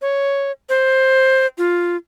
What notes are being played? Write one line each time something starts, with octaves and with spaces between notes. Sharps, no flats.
C#5
C5
F4